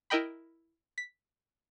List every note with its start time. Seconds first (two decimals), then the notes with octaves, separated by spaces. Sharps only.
0.10 E4 A#4 D#5 G5 B5
0.98 B6